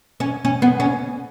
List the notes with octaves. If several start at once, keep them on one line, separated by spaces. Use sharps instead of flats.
C#4
C#4
B3
C#4